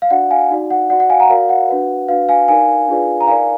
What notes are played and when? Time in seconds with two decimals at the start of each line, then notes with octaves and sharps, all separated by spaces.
0.02 F5
0.10 D4 F#4 D5 F#5
0.30 F5 G#5
0.51 D#4 F#4 D5
0.71 F#5
0.90 F#4 D5 F#5
1.00 F#5
1.10 F5 G#5
1.20 F#5 A#5
1.29 F#4 A#4 D5 F5
1.49 F#5
1.69 D4 F#4 B4
2.08 D4 F#4 B4 F5
2.29 F5 G#5
2.48 D#4 A#4 D5 F5 G#5
2.88 D4 F4 G#4 B4 D5
3.21 A#5
3.27 D#4 A#4 D5 F5 G#5